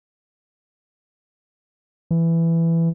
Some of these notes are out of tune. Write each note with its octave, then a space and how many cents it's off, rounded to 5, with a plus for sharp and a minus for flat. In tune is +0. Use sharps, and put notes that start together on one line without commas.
E3 +10